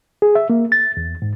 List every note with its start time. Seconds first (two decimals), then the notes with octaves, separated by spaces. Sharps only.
0.22 G#4
0.35 E5
0.50 A#3
0.72 A6
0.97 E2
1.22 G#2